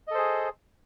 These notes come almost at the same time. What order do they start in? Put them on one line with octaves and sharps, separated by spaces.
D#5 A4 C5 G#4